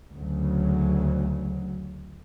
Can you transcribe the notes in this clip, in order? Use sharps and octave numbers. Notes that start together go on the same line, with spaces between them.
D2 C#3 F#3